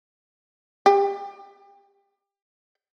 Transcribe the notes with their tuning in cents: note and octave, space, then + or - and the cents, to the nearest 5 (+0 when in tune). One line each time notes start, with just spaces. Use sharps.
G4 +25